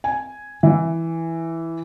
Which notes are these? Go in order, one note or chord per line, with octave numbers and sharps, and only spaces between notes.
G#5
E3